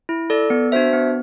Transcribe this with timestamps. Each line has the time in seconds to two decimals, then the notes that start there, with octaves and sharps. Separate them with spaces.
0.09 E4
0.30 A4 D5
0.50 B3
0.72 D4 F#4 C5 E5
0.93 B3